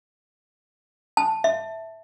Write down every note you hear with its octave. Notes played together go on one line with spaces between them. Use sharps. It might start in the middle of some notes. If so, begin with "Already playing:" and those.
A5
E5